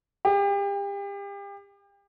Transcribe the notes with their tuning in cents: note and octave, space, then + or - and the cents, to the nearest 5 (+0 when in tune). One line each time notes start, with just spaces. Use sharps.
G4 +35